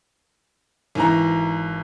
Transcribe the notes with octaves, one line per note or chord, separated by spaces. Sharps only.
G#1 E3 A#5